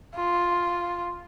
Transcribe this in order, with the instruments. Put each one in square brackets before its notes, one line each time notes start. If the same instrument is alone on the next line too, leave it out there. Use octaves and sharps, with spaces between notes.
[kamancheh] F4